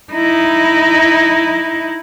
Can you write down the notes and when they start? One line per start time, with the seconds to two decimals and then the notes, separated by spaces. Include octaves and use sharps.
0.13 D#4 E4